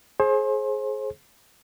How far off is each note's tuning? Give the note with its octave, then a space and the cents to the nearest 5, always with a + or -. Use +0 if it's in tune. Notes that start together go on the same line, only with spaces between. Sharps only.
G#4 +25 C5 +35